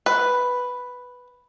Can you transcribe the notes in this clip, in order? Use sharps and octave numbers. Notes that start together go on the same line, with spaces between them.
B4